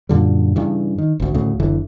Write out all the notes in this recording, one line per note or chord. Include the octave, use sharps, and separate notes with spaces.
F#2 A#2 D3 G3
G2 C#3 E3
D#3
G#1 D2
D2 A2 C#3
F#1 D3 E3